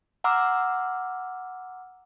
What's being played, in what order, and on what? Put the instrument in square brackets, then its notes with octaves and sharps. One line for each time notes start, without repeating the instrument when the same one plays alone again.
[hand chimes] F#5 A#5 C6 D6 E6 F6